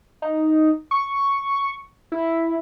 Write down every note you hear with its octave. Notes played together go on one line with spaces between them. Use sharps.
D#4
C#6
E4